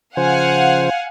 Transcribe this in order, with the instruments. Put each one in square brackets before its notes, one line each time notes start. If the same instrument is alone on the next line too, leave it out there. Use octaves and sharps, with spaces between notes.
[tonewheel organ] C#3 F3 C5 [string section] F5 F#5 G#5